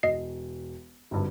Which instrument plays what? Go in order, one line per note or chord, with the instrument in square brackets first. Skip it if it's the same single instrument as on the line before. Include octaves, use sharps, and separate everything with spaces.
[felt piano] E1 [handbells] D#5 C7
[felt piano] G#1 G2 D3